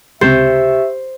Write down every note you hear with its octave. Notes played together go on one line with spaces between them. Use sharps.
C#2 C3 G4 C5 E5